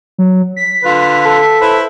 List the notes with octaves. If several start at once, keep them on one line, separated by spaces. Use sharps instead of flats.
F#3
B6
D3 F4 B4
A4
E4 B4 C5